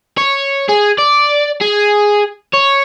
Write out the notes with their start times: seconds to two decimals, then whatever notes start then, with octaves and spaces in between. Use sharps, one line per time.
0.17 C#5
0.69 G#4
0.98 D5
1.61 G#4
2.54 C#5